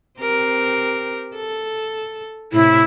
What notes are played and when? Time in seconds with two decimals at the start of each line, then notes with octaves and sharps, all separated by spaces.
0.20 C4 G4 A#4
1.35 A4
2.53 A2 C3 E4